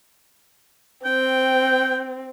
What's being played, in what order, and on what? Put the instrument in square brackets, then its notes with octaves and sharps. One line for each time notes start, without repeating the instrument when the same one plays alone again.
[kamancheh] C4 [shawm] G5